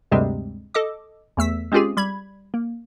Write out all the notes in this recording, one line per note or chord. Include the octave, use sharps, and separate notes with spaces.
D2 G2 C3 G3 G#3 C4
A4 D#5 D6
E2 A3 E6 B6
G#3 C4 C#4 F4 G4 G#4
G3 B5 G#6
A#3